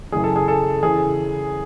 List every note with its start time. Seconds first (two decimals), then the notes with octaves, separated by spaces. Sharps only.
0.12 F#2 C#3 E3 G#4
0.24 A4
0.36 G#4
0.48 A4
0.83 E2 C#3 E3 G#4